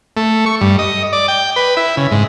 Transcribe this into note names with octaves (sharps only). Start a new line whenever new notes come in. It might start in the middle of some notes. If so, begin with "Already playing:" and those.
A3
C#6
G2
D#5
D5
G5
B4
E4
C#3
G#2